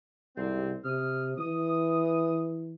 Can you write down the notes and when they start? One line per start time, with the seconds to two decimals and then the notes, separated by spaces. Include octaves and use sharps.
0.37 C2 G#2 C3 C4
0.85 C3 D#6 F6
1.38 E3 D#6